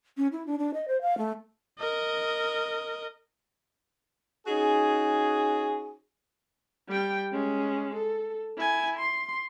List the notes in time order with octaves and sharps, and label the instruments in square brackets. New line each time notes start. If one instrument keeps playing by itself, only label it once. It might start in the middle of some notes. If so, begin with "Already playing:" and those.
[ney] C#4
E4
D4
D4
D#5
C5
F5
A3
[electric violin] A#4 D#5
[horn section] C#4 D#4 F#4 G#4
[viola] G3 G5
G#3 C#4
A4
E4 G#5
C6